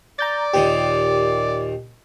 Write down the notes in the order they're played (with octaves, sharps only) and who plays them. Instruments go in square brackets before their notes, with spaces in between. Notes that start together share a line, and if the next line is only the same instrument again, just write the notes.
[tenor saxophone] D5 [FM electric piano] A#5 G6 A6
[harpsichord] D#2 A#2 D#3 [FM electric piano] G4